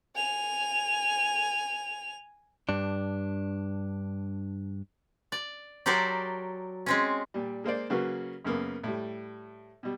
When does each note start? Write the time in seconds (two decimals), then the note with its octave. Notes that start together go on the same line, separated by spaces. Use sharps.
0.15 G#5 F7
2.69 G2 D4
5.32 D5
5.86 F#3 G4 A4 A#4 C5 D5
6.86 G#3 C4 C#4
7.34 A#2 G3
7.64 G#3 A#3 C5 D5
7.90 C#3 F#3 A#3 F#4 B4
8.45 F#2 C#3 A#3 B3
8.84 A2 G3
9.83 B2 G3